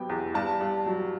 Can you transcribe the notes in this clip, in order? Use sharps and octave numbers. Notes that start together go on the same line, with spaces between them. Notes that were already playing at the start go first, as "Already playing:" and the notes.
Already playing: C3 F#3 B3 G5
E2
G2 A5
G2
F#3